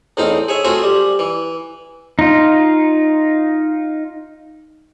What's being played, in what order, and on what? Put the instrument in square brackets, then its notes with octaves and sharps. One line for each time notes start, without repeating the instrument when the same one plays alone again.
[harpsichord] E2 A2 C4 D#4 F5
G#4 C#5 E5
A3 C4 F4 F#4 G#4 E5
G3
E3
[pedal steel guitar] D#4 F4